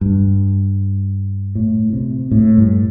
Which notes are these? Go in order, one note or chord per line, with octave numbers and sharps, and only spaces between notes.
G2
A2
C3
A2
G2